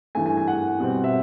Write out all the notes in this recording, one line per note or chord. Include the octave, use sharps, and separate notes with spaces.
G2 E3 A3 G#5
G#5
G#5
F#5
B2 G3 C4
E5